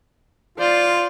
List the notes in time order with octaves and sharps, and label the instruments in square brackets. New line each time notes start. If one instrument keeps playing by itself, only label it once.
[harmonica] F4 [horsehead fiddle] C5 D5